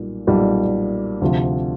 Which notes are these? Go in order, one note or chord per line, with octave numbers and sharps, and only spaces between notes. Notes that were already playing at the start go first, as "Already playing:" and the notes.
Already playing: B1 A#2 G3
B1 A#2 G3
D2 C3 F3